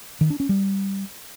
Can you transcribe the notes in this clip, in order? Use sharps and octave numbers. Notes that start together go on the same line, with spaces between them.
D#3
D4
C#4
G3